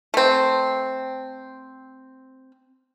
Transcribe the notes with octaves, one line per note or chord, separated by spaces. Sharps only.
A3 C4